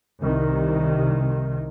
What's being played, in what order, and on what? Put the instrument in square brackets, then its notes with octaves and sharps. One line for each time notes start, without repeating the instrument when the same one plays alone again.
[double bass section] C2 C3 D#3